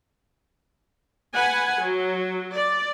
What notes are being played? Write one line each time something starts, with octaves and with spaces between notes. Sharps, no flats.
B4 F#5 G#5
F#3
D5